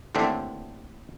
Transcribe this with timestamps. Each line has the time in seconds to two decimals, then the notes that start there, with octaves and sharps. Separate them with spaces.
0.15 D#2 A2 D3 C4 D4 E5